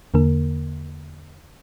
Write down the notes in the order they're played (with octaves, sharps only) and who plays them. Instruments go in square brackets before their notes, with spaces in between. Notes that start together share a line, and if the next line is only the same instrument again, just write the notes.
[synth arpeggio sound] E2 D3 A#3 A#4